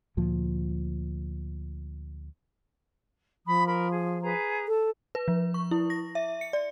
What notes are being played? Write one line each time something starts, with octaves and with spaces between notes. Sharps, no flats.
D2 A#2 F3
F3 B5 D#6
A#4 B5
G#4
G#4 B4 A#5
A4
B4
F3
C#6
E4
A#6
E5
C#7
D5